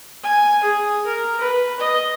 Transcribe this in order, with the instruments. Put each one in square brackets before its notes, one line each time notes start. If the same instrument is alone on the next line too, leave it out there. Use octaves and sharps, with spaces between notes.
[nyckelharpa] G#5
G#4
A#4
B4
D#5